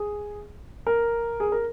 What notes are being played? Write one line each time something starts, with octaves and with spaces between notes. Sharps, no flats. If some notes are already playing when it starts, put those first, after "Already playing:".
Already playing: G#4
A#4
G#4
A#4